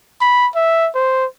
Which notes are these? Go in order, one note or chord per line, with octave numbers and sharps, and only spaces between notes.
B5
E5
C5